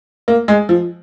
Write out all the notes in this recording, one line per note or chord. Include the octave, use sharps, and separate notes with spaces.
A#3
G#3
F3